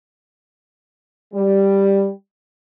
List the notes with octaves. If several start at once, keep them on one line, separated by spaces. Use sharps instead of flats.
G3